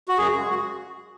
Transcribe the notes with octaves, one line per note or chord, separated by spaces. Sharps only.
F#4
F#2 G#4
C#3 G#3
F#4